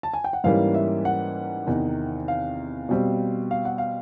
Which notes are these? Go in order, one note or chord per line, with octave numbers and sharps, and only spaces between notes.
A5
G#5
G5
F#5
G#2 E3 G3 A#3 C#4 F5
E5
F#5
E2 C3 D#3
F5
B2 G3 C4
F5
F#5
F5